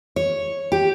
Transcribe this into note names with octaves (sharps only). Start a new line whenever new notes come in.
C#5
G4